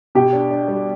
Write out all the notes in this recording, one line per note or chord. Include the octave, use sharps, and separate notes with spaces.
B2 G4
D4
D4
G3